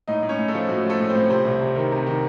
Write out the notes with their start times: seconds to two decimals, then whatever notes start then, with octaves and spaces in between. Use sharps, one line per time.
0.08 A2 D#4 D#5
0.23 A2
0.29 C#4 C#5
0.39 A2
0.48 A3 A4
0.55 F3
0.69 A2 F#4
0.85 F3 A3 A4
1.00 A2
1.10 C4 C5
1.16 A2
1.30 C3 C4 C5
1.45 C2
1.61 C3
1.76 D#3
1.92 C3
2.06 D#3